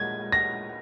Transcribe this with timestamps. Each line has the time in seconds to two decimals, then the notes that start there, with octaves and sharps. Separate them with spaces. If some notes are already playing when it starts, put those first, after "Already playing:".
Already playing: A#2 G#3 G#6
0.32 A#6